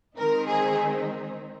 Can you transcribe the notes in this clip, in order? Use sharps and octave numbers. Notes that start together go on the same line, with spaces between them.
D#3 G#3 C4 D#4 A#4
G#4